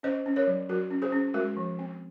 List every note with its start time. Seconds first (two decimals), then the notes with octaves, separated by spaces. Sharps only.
0.03 C#4 C5 D#5
0.26 C#4
0.36 A#4 C#5
0.47 F#3
0.69 F#3 F#4 A#4
0.90 C#4
1.02 G#4 C5
1.12 C#4
1.34 G#3 F#4 A#4
1.57 F3
1.79 C4